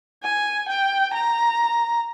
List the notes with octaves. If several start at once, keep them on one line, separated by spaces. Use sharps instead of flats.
G#5
G5
A#5